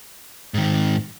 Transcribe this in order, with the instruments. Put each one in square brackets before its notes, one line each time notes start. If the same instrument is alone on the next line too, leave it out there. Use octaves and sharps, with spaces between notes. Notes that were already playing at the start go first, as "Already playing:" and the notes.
[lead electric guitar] G#2 D#3